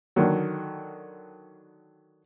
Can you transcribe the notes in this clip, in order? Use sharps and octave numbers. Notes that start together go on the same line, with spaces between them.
D3 D#3 F#3